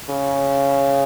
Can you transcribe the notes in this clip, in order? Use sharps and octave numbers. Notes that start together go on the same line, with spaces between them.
C#3